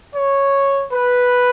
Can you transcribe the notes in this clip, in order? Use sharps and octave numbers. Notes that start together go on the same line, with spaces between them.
C#5
B4